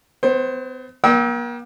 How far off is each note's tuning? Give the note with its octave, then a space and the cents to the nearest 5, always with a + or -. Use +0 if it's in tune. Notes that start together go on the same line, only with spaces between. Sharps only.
B3 +45 C5 +20
A#3 +40 G5 -15 E6 -35